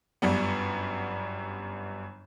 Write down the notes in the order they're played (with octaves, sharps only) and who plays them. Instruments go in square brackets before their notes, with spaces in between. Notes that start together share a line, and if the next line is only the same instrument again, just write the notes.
[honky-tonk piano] G1 F#2 G3 B3